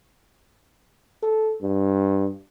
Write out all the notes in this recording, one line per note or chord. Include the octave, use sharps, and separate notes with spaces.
A4
G2